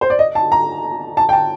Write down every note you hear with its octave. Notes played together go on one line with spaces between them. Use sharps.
C5
D5
D#5
A5
A#5
A5
G5
A5